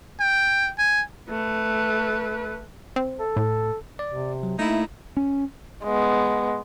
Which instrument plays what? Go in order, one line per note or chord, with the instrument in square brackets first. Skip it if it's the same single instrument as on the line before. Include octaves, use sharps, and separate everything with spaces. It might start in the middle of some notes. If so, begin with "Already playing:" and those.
[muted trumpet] G5
G#5
[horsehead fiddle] A3 B4
[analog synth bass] C4
[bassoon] A4
[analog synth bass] A2
[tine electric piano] D5
[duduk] C3
[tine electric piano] F#3
[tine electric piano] A3 [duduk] A#3 [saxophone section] D#4 E4
[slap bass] C#4
[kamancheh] G#3 B3